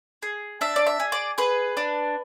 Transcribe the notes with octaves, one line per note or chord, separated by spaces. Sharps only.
G#4
D4 E5
D5
E5
G#4
D5
G#4 B4
D4